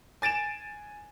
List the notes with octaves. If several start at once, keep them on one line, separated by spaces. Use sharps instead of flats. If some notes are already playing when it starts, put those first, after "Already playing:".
G#5 A6 D7 E7